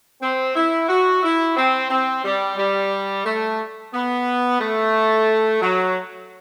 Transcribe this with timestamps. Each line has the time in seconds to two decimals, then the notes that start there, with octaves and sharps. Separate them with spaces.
0.21 C4
0.55 E4
0.88 F#4
1.23 E4
1.56 C4
1.90 C4
2.24 G3
2.57 G3
3.25 A3
3.93 B3
4.60 A3
5.62 F#3